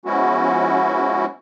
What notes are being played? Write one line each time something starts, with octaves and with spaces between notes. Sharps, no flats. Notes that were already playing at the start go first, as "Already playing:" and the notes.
F3 G#3 B3 C#4 E4 F#4